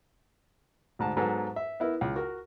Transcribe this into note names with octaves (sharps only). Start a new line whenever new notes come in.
D2 G#2 A5
G#2 F#3 B3 A4 G#5
E5
B3 E4 A#4
C#2
F#4 A#4